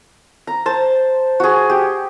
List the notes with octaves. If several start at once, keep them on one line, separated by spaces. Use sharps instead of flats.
A#5
C5 A5
F#4 G#4
G4